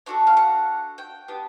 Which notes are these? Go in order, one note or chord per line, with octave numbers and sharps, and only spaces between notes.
D4 F#4 A4 C#5
F5
F#5
G5
B3 D4 G4